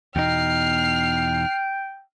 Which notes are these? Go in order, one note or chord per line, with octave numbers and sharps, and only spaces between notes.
E2 B2 D#4 G5 F6 C7